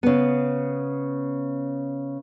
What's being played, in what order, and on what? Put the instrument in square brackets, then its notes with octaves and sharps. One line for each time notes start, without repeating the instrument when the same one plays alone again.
[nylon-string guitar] C#3 B3